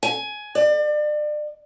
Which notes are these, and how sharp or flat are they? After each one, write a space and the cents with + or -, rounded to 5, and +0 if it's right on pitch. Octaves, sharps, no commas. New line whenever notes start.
G#5 +15
D5 +35